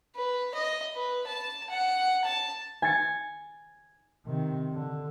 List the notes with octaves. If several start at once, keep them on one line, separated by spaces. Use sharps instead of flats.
B4
D#5
B4
A5
F#5
A5
G#5 A6 C#7
C3 D#3
D3